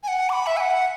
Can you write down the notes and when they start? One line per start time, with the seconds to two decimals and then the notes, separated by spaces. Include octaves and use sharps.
0.03 G#5
0.08 F#5
0.29 D6
0.33 B5
0.47 E5
0.57 G#5
0.60 F#5